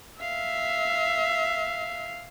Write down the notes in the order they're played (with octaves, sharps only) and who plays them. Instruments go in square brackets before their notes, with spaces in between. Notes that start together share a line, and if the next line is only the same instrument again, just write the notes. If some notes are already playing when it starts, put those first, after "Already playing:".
[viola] E5 [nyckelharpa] F5